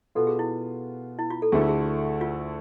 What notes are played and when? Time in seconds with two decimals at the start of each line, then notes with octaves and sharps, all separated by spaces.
0.15 B2 B3 F4 A4
0.27 G#4
0.39 E4
1.19 E4
1.30 F4
1.42 A4
1.52 D2 D3 A3 E4 G#4 A4
1.61 F4
1.69 G#4
2.21 F4